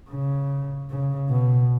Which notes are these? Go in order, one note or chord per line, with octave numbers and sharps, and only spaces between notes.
C#3
C#3
B2